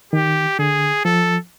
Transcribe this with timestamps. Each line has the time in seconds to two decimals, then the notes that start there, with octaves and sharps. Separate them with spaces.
0.13 D#3 G4
0.59 D3 G#4
1.05 F3 A4